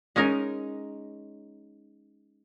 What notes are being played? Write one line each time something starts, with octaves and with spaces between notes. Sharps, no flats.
G#3 C#4 D#4 A#4